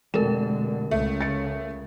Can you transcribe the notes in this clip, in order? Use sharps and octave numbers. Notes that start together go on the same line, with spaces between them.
F1 B2 D3 G#3 A4 A#4 E7
C#2 C#3 A3
A6 C#7